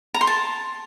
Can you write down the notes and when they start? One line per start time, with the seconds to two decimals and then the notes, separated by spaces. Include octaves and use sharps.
0.14 A#5
0.21 C6
0.27 A5